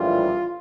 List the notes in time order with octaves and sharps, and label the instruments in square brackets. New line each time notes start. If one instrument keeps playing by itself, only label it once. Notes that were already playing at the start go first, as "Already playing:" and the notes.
Already playing: [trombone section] A#1 A2 E3 G3 F4